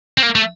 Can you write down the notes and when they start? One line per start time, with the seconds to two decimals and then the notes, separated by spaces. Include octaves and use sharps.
0.18 C4
0.23 A#3
0.35 A3